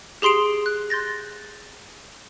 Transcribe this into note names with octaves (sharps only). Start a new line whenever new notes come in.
G4 G#4 C6 C7 D7
F#6
C6 G6 A6 A#6